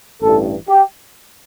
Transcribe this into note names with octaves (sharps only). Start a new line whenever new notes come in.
A1 G2 E3 A4
G4